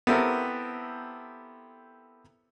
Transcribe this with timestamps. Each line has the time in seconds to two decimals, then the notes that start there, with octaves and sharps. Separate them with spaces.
0.07 B3 C4 E4 G4 A4 A#4